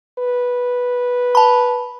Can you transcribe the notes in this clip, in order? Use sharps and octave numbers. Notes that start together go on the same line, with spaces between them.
B4
A5 B5